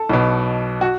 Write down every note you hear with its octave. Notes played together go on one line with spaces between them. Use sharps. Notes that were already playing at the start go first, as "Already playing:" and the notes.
Already playing: A4
B1 B2
F#4